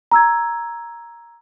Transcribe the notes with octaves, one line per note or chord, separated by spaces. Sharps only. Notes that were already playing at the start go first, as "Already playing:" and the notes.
A#5 E6 G#6